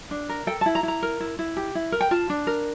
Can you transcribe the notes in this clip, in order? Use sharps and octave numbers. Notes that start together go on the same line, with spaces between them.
D4
A#4
A4 G5
A5
E4
A#5
E4
A#5
A#4
E4
E4
G4
E4
A#4
G5
F4 A5
D4
A#4